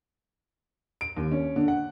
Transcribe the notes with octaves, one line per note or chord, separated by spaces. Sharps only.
D7
D#2
C#4
D3
F#5